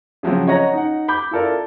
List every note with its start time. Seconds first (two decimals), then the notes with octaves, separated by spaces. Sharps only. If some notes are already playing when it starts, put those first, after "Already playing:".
0.23 C#3 F3 F#3 C4
0.47 C#5 D#5 F#5 A#5 A#6
0.73 D#4 F#5
1.08 B5 D6 G6
1.31 E4 F4 A4 A#4 D5